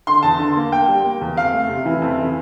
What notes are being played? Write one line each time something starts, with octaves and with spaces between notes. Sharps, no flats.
D3 C6
E2 A5
D3
A#3
A#3 G5
G3
A#3
E2
F2 F5
A3
C3
E3
F2
E3